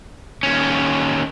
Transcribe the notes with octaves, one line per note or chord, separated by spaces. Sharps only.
D#2 C#4